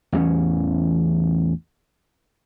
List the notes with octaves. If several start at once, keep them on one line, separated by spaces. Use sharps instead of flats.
A1 E2 E3 C#4